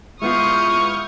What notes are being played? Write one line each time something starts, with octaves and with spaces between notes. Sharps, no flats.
G#3 B3 E4 F4 C#6 D#6 F6 G6